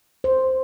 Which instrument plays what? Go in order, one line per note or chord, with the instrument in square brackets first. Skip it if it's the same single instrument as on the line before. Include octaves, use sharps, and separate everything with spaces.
[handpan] C5